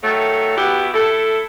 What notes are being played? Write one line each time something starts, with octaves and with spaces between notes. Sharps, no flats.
D#3 F#3 A3
B3 E4 F#4 G4
A3 E4 A4